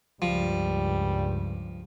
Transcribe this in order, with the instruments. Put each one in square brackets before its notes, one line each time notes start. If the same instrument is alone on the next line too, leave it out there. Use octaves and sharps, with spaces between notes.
[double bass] C#2 G2 [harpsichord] F3 [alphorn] G3